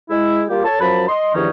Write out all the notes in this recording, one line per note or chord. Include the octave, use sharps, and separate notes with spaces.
G#3 E4
G3 A#3 F4 G4
A4 C#5 A5
F#2 F3 F#3 A5 B5
D#5 C6
E2 G2 D#3 F3 C#4 D#4